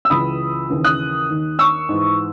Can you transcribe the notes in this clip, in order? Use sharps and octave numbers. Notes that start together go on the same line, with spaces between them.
E6
C#2 C#3 E3 B5 D#6
D#2 C#3 E3
D#6 F#6
D#2 D#3
C#6 E6
G#2 E3